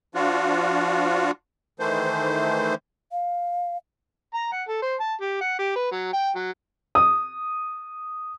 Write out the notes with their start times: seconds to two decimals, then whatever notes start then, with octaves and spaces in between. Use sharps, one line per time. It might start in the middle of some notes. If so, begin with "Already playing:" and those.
0.15 F3 D4 F4 F#4
1.80 D#3 E3 A3 C5
3.11 F5
4.34 A#5
4.52 F#5
4.68 A4
4.82 C5
5.00 A5
5.21 G4
5.41 F#5
5.59 G4
5.76 B4
5.92 F#3
6.13 G5
6.36 F#3
6.95 D#6